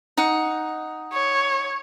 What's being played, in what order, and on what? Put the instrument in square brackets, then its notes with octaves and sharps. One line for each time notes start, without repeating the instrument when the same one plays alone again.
[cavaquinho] D#4 F#5
[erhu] C#5